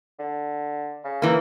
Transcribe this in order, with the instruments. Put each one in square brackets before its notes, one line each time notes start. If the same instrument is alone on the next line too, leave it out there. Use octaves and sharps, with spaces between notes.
[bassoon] D3
C#3
[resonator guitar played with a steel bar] E3 A#3